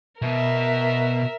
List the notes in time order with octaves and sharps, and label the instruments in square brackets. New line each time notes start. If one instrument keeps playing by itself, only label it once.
[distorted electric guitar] B2 [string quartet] A#4 E5